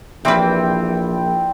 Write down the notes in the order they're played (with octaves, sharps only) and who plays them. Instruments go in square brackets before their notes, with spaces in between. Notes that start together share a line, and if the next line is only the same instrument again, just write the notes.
[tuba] A#1 [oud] E3 B4 [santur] G3 C4 G5